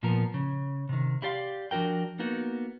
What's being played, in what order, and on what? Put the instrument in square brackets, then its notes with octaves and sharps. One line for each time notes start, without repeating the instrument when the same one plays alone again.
[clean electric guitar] A#2 F3 B3 A#4
C#3
C3 D#3
E4 G4 D5 F5 C6
F3 D4 F#4 A#4 G5
A#3 B3 D#4 F#4 A#4